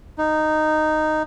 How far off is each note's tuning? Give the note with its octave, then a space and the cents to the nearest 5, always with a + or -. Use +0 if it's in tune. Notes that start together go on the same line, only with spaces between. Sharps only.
D#4 -10